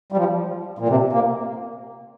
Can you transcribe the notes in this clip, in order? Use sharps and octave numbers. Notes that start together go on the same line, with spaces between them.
G3
F3
A#2
C3
A#3